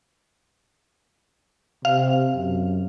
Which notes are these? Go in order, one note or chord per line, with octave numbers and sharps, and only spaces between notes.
C3 F5
F#2